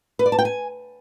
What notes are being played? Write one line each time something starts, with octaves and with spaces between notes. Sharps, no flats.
B4
D5
A5
G5
G#5